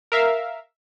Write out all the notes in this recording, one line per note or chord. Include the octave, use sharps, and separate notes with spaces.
A#4 E5 F5